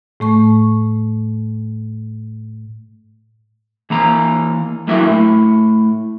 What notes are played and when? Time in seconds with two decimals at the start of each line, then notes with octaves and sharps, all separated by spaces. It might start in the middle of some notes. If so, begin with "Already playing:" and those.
0.20 A2 A3 C#6
3.90 E3 A#3 A#5
4.88 G2 F#3 A#3 E4 E5
5.08 A2